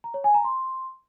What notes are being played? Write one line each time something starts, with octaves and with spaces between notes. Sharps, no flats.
A#5
C#5
G#5
A#5
C6